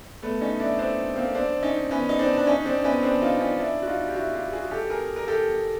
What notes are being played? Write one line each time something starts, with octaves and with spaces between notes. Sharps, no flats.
A3 B3
C#4 D#4
D4 E4
C4 D4
A#3 C4
C4 D4
C#4 D#4
B3 C#4
D#4
C4 D4
D4
C#4 D#4
C4 D4
B3 C#4
C4 D4
D#4 F4
C#4 D#4
D4 E4
F#4
D#4 F4
G4
E4 F#4
F4 G4
F#4 G#4
G4 A4
G#4 A#4
A#4
G4 A4